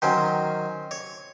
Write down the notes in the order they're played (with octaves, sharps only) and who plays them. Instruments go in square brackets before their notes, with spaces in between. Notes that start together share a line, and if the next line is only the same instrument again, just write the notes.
[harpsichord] D#3 F#3 C#4 C5
C#5